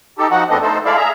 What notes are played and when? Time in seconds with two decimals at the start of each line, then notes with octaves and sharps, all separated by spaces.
0.18 D#4 G4 A4
0.31 F3 D#4 F#4 F#5
0.50 E2 A3 B3 C4 D4 D#5
0.62 A3 D#4 A4 C5
0.85 G#3 E4 A4 D5 E5 F5
0.96 G#4 E5 A#5